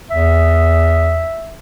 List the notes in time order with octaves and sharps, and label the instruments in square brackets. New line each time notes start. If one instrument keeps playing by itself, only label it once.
[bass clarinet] E2 [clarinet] E5